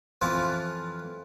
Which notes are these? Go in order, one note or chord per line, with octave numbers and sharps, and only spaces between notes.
F2 E3 F4